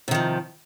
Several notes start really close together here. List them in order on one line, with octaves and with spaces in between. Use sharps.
C3 D#3 F3